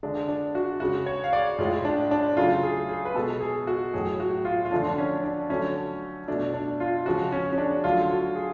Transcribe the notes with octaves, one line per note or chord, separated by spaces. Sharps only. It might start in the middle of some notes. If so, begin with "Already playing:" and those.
D3 G#3 D4
D4
F#4
C#3 G#3 F#4
C#5
F5
D5
A2 G#3 F4
D4
D4
C#3 F#3 A3 F4
G#4
G#4
B4
B2 G#3 A4
G#4
F#4
A2 F#3 A3 G#4
F#4
F4
F4
D3 F3 A3 D4
D4
C#4
D4
D3 F#3 A3 C#4
B2 A3 D4
D4
F4
C#3 F3 G#3 F#4
C#4
C#4
D4
D3 F#3 A3 F4
F#4
G#4